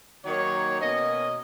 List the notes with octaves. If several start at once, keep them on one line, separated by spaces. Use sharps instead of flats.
D#3 F#3 A#3 D#4 C#5
B2 A#3 C#4 D#5